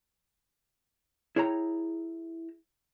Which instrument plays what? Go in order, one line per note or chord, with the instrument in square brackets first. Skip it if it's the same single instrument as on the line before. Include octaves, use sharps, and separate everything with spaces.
[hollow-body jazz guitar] E4 G#4 C#5 G5 A#5